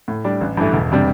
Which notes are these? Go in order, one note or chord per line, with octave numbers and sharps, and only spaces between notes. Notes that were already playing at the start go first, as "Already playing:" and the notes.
A2
G3 D4
A1
G2 E3 A3
E1
C3 G3 D4